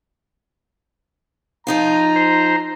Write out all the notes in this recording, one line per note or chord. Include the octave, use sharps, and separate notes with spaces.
F3 D#4 F4 A#5
C5